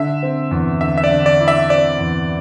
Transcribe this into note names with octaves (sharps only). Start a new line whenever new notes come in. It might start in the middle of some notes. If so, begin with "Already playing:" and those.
Already playing: D3 E5
C4
E2
D3 E5
E5
D5
D3
D5
E4
E5
C4 D5
E2